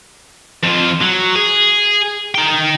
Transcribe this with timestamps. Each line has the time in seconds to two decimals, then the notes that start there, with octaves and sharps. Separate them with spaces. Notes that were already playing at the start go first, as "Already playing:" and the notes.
0.63 F2 F4
1.01 F#3
1.36 G#4
2.35 D#4 G5